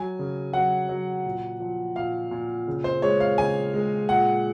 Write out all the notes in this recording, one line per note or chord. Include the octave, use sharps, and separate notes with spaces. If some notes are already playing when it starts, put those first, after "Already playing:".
Already playing: F#3 G#5
C#3
F#3 F#5
F#3
A#2
F3
A#2 F5
A#2
C#3
C5
G#3 C#5
F5
C#3 G#5
G#3
A#2 F#5